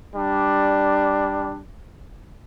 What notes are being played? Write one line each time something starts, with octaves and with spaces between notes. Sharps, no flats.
G3 D4